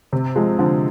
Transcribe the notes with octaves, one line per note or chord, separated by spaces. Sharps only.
C3
F3 G#3
D3 F3